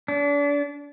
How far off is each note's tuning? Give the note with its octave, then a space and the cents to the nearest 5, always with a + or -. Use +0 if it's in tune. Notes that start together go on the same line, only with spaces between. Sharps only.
D4 -35